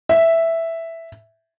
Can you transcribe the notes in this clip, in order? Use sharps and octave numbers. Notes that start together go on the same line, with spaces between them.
E5